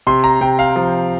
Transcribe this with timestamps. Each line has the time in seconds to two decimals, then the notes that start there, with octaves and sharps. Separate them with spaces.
0.07 C3 C6
0.24 A#5
0.41 C3 G5
0.59 F5
0.76 F3